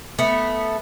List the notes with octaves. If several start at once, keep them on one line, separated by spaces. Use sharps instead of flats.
A3 B3